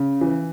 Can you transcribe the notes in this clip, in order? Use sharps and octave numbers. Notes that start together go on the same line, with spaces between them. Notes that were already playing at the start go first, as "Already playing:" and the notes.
Already playing: C#3
E3